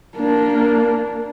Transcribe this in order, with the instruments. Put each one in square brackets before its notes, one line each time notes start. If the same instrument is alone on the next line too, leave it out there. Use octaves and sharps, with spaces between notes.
[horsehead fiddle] A#3 D4